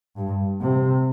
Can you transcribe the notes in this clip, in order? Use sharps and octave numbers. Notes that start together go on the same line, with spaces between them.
G2
C3